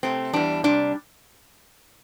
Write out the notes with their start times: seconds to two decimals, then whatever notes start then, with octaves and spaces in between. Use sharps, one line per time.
0.03 C3 A3 C4
0.33 E2 E3 G3 D4
0.64 C3 G3 D4